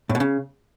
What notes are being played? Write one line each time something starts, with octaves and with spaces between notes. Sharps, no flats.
A2
B2
C#3